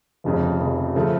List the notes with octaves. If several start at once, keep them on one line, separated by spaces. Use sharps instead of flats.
F1 F2 C#3
F1 F2 C#3
C#3 F3 A3